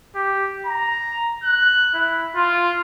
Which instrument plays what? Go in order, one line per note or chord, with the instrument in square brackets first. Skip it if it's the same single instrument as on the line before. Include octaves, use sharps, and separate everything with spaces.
[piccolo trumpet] G4
A#5
F#6
E4
F4